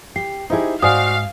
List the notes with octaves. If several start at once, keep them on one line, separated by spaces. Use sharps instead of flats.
G4 C7
D#4 E4 G4 G#4 C5
G#2 F#4 C5 D5 F5 G#5 D#6